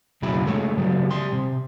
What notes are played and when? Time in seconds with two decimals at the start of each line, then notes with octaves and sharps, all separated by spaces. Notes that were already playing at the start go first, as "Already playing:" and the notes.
0.22 B1 F#2 C#3 F#3 E4 B5
0.46 G#3 A3 C#5
0.77 C#3 F#3 G3
1.10 G3 C6
1.33 C3